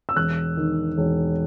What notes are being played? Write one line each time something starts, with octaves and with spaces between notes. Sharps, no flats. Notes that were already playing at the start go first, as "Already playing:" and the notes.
E6
E1 F#6
D#3
E1